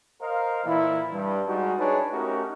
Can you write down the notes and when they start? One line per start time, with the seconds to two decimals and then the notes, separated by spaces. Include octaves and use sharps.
0.22 A#4 C5 D#5 F5
0.65 A#2 E3 E4
1.13 G2
1.47 G3 G#3 D#4 F#4
1.78 D4 D#4 G#4 B4 C#5
2.12 A3 C#4 D#4 F#4 G4 A#4